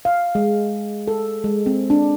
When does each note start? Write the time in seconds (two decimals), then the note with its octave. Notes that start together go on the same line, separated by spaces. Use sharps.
0.05 F5
0.35 G#3
1.08 A4
1.44 G#3
1.66 C4
1.90 D4